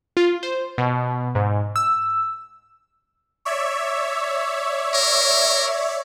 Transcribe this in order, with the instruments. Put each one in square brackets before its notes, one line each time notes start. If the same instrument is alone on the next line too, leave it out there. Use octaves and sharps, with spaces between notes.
[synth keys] F4
C5
B2
G#2
E6
[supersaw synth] C#5 D5 E5
[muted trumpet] A#4